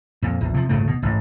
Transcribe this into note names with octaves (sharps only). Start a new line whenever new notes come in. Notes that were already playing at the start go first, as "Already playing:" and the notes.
F2 A#2
A#1 E2
C3 F3
D#1 G#1 C#3 A3
B2
A1 G#2